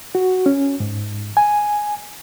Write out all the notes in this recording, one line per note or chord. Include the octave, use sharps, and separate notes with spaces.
F#4
C#4
G#2
G#5